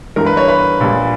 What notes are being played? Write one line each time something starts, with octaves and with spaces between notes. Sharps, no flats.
G1 G2 E3 G3 A#4
B4
C#5
B4
A#1 A#2 G3